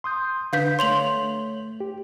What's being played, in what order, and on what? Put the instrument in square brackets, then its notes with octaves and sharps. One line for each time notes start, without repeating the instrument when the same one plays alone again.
[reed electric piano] C6 D#6 G6
[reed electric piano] D3 D4 B4 [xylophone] F5 G6 B6
[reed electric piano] A3 C#5 [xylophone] C6 F7 F#7
[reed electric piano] G4